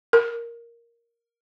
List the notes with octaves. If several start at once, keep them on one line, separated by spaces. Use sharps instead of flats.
A#4